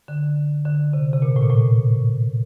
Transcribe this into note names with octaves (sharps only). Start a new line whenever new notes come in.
D3
D3
C3
C3
A#2
A2
A#2
A2